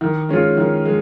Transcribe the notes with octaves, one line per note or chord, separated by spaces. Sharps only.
D#3
G#3 C#4 F4
D#3
G#3